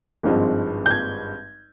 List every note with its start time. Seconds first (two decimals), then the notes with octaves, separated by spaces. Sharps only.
0.23 G#1 G2 F3 G#3 C4
0.86 G6
0.91 G#6